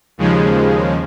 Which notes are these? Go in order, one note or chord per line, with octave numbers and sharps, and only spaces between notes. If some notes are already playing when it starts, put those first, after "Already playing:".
D#2 C#3 F3 G#3